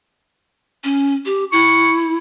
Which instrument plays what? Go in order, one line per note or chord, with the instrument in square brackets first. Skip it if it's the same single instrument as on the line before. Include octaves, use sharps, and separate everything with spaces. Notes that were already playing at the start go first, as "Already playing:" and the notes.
[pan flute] C#4
G4
[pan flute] E4 [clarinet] C#6